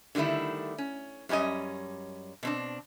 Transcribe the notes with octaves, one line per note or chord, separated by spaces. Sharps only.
D3 D#3 G3 A3 E4
C#4
F#2 G3 C#4 D4 D#5
B2 C4 D4